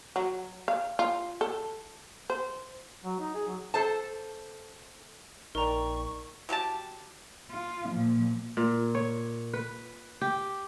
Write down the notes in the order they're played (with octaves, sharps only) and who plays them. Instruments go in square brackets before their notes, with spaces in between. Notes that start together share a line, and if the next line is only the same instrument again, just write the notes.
[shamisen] F#3
F5
F4
A4
C5
[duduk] F#3
D#4
G#4
F#3
[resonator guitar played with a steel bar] A4 C5 A5
[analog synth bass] A#1 [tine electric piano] D#4 D5 G5 [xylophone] A#4 A#5 [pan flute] C#6
[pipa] F#3 G4 A4 A5
[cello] F4
A#2 F3
[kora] A#2
C#5
B4
G4